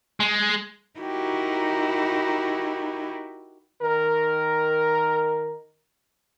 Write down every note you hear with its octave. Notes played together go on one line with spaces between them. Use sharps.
G#3
D#4 E4 F#4 G4 A#4
D#3 A#4